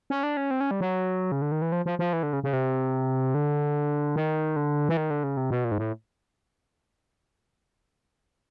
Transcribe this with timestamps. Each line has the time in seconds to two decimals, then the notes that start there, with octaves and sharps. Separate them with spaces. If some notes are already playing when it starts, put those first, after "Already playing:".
0.10 C#4
0.23 D4
0.37 C#4
0.51 C4
0.61 C#4
0.71 G3
0.81 F#3
1.32 C#3
1.42 D3
1.52 D#3
1.62 E3
1.72 F3
1.86 F3
1.99 F3
2.13 E3
2.23 D3
2.33 C#3
2.44 C#3
2.53 C3
3.35 D3
4.16 D#3
4.56 D3
4.89 E3
4.97 D#3
5.10 D3
5.24 C#3
5.37 C3
5.50 B2
5.64 A#2
5.72 G#2
5.78 A2